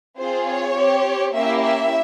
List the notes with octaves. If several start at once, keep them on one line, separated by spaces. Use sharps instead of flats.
C4 F4 G#4 C5
C#5
C4 G4
A#3 C#4 E4 G4 E5
E5